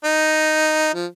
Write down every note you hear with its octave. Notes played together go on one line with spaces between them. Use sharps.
D#4
F3